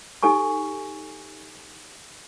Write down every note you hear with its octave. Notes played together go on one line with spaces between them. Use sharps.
D#4 G4 A4 G#5 C#6